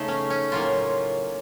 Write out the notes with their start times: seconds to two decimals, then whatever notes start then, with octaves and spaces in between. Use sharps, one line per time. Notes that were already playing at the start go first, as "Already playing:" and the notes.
Already playing: C#3 A3 D#4
0.08 C#4
0.30 C#4
0.52 A2 F#3 A#3 F4